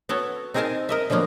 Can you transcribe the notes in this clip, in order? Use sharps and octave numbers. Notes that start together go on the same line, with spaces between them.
B3 F#4 A4 C#5
C4 D#4 G#4 A#4 G#5 A5
A#4 D#5 E5
D3 F3 F#3 A#3 B3